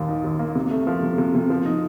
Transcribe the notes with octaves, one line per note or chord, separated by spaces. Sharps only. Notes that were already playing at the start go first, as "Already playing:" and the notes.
Already playing: D#2 A#2 D#3 A#3
D#4
D#2
A#3
C3
A3
F3
C3
C3
C3
F3
D#4